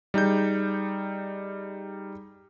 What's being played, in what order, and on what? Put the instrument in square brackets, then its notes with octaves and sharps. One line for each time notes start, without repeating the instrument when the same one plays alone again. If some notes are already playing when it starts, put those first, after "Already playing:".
[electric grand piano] G3 D#4 G#4 G6